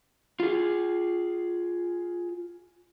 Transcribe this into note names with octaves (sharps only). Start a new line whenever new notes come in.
F4 G#4